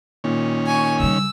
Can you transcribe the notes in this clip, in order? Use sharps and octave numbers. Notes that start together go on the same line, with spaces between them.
A#2 D#3 C#4
G#5 C#6
C#3 G3 E6